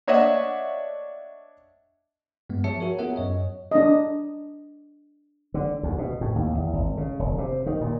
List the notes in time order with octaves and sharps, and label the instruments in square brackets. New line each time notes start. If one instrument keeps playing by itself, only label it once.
[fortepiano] D4 C#5 D#5 E5 F#5
[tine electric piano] G2 G#3 B3
F3 G#4 C#5 E5 A5 C#7
F#4 A#4 C#5
B3 F4 G#4 A#4 E5 F#5
F#2 C#5 D#5
[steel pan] D4 D#5
[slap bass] D3
D2
B2
A2
D#2
E2
G#1
C#3
E1
C3
D#3
A#2